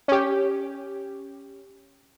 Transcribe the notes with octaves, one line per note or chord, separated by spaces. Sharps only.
C#4 G4